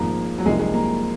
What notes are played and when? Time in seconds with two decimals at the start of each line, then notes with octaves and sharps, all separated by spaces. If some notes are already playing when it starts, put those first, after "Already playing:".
Already playing: G#1 G#2 F3 A#3
0.38 F#3
0.45 C2 C3 F3 G#3 A#3 D#4
0.59 G#3
0.74 A#3